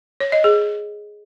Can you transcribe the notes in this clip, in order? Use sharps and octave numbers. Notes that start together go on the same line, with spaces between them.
C#5
D#5
G#4